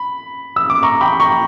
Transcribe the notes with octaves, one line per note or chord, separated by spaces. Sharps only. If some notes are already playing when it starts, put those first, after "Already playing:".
Already playing: B5
E6
D6
A#5 C#6
G5 B5
A#5 C#6